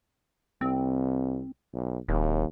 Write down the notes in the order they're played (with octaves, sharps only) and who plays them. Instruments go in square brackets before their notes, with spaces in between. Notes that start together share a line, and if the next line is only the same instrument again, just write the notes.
[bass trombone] C2 [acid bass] C4
[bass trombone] B1
[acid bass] D1 [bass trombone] D#2